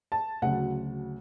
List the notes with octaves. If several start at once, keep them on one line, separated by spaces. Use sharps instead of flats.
A5
D2 C#3 F#3 F#5